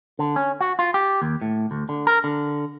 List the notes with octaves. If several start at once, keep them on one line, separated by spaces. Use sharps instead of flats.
D3
C#4
F#4
F4
G4
D#2
A2
D2
D3
A#4
D3